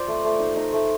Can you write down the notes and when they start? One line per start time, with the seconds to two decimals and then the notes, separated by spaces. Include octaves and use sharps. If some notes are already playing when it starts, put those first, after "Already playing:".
Already playing: F4 C5 D5
0.08 A3
0.24 A3
0.40 D#4
0.57 D#4
0.73 A3